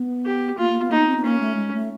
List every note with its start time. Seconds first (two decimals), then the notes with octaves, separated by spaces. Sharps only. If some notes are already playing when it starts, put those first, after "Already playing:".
Already playing: B3
0.26 G4
0.58 A#3 F4
0.69 A#3
0.81 B3
0.91 A#3 D#4
1.00 B3
1.08 C4
1.16 B3
1.24 A#3 C#4
1.40 A3
1.56 G#3
1.74 A3